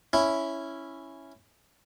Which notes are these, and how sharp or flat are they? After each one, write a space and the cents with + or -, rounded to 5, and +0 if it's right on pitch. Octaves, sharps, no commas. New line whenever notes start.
C#4 +0 E4 +0